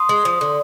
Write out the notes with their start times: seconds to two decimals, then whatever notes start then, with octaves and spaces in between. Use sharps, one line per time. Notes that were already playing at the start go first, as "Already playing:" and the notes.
Already playing: C6 D#6
0.09 G#3
0.25 F3
0.41 D3